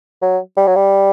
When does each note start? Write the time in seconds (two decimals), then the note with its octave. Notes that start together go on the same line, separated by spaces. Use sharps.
0.22 F#3
0.57 G3
0.67 F#3
0.76 G3